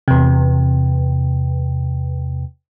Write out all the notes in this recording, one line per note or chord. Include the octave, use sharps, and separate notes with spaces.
E2 C3